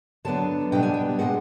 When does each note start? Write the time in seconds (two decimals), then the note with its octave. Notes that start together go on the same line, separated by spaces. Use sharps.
0.25 D3 F#3 B3 D4 A5
0.72 B2 G3 B3 D4 G5
0.83 G#5
0.94 G5
1.19 C3 F3 G#3 F#5